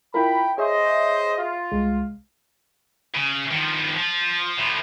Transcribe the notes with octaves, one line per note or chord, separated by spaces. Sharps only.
E4 F4 A#4 G5 B5
G#4 C5 C#5 D#5 E5
F4
C2 G#3
C#3
D#3 F3
F3
A2 F3